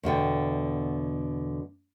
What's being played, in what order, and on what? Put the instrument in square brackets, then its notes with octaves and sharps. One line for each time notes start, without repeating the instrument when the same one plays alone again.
[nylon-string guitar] E2 B2 D3 G5